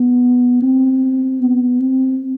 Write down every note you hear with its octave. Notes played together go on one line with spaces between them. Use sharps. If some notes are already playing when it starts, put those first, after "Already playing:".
Already playing: B3
C4
B3
C4